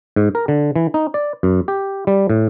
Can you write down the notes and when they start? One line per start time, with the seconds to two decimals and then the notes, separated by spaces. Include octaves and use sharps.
0.16 G#2
0.35 A#4
0.48 D3
0.76 E3
0.94 D#4
1.14 D5
1.43 F#2
1.68 G4
2.07 G3
2.30 A2